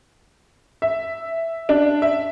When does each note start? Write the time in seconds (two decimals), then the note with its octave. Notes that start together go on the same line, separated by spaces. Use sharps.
0.82 E5
1.69 D4
2.02 E5